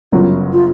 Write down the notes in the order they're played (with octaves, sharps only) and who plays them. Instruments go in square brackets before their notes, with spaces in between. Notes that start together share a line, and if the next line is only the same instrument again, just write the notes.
[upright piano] G1 F#2 C#3 F#3 [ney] F4
[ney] F4